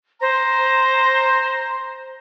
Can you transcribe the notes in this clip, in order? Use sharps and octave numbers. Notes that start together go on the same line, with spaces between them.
C5 A#5